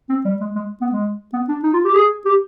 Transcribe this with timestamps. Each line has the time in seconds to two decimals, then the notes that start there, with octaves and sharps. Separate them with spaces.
0.09 C4
0.25 G3
0.41 G#3
0.56 G#3
0.81 B3
0.92 G#3
1.33 B3
1.49 D4
1.63 D#4
1.74 F4
1.85 G4
1.94 G#4
2.25 G4